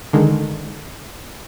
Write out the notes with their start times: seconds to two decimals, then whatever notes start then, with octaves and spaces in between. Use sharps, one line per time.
0.13 D3 D#3 G#3